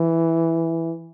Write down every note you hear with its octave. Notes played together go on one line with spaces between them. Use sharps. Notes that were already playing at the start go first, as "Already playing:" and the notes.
Already playing: E3